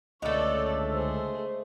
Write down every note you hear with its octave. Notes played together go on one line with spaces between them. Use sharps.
C#2 D3 G#3 A3 A4 C#5 D5
G#4 C5